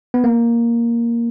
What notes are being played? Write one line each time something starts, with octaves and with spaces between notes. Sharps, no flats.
B3
A#3